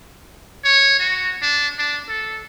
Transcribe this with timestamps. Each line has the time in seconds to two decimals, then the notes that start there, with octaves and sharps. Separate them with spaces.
0.65 C#5
1.00 F#4
1.42 D4
1.79 D4
2.09 A4